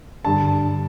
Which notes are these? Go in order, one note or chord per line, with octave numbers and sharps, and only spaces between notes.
G2 D3 G3 D4 A5